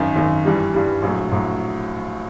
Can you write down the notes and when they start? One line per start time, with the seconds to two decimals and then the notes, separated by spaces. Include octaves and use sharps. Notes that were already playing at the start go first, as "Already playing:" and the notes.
Already playing: G#1 F#2 D#3
0.16 G#1 F#2 D#3
0.45 G2 E3 G3
0.74 G2 E3 G3
1.02 A#1 A2 F#3
1.31 A#1 A2 F#3